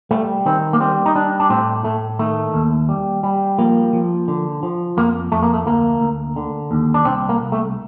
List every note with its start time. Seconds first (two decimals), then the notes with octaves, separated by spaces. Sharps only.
0.11 G3 A3
0.46 D#3 C4
0.73 A#3
0.80 G3 C4
1.06 D#4
1.15 G3 D4
1.40 D4
1.50 A2 C4
1.84 A2 A3
2.19 D#3 A3
2.54 D#2
2.89 G3
3.23 G3
3.58 F3 A#3
3.93 F3
4.28 D3
4.63 F3
4.97 F2 A#3
5.32 F2 A3
5.43 A#3
5.54 A3
5.66 D2 A#3
6.01 D2
6.36 D3
6.71 D#2
6.94 D4
7.05 C2 C4
7.29 A#3
7.40 C2
7.52 A3